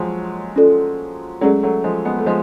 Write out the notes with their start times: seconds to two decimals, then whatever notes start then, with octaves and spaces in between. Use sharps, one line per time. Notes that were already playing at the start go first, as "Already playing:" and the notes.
Already playing: F3 F#3 G#3
0.56 C#4 F4 A4 D5
1.41 F#3 G#3 A3 C#4 G#4 D5
1.63 F#3 A3
1.84 F3 G#3
2.05 G#3 B3
2.18 A3
2.26 F3 G#3 A4